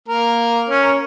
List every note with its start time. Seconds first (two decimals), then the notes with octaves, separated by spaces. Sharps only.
0.08 A#3 A#4
0.69 C#4 C#5
0.83 A#4